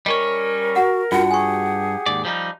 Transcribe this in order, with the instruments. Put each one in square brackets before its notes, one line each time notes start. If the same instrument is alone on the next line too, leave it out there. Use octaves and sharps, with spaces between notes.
[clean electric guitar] G3 C#4 C#5 [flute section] A#4 [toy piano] D#5
[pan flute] F#4 [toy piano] F#5
[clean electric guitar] G2 [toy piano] F4 F#4 [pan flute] F#5
[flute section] G4 G#4 [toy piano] G#5 C#6
[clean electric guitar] D#2 G#2 D5
F3 G3 D#4